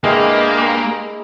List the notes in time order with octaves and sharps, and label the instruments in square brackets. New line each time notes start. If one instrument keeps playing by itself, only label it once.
[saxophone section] E2 G2 [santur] G#3 E4 [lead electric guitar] A#3